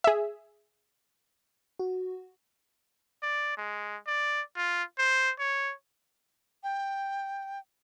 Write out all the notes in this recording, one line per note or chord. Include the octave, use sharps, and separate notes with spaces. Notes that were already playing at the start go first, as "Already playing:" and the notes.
G#4 E5
F#4
D5
G#3
D5
F4
C5
C#5
G5